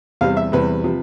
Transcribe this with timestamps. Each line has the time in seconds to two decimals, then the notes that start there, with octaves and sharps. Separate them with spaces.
0.21 E2 C3 G3 F5
0.37 E5
0.52 E2 C3 G3 B4
0.84 C3 F3